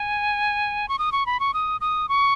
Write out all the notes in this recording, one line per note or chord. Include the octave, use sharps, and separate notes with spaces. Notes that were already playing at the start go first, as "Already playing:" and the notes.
Already playing: G#5
C#6
D#6
C#6
B5
C#6
D#6
D#6
C#6